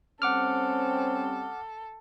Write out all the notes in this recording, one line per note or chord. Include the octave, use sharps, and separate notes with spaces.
G3 C4 C#4 A4 F#5 D6 F6